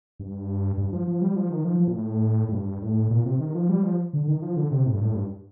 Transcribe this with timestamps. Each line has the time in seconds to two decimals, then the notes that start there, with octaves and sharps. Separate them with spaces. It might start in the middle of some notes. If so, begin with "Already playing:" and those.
0.20 G2
0.77 G2
0.93 F3
1.08 F3
1.21 G3
1.36 F3
1.50 D#3
1.65 F3
1.80 F3
1.88 A#2
1.94 A2
2.49 A2
2.52 G2
2.82 A2
3.11 A#2
3.25 C3
3.40 D#3
3.55 F3
3.69 G3
3.83 F3
4.13 D3
4.28 D#3
4.42 F3
4.56 D3
4.71 C3
4.86 A2
4.94 G2
5.01 A2
5.15 G2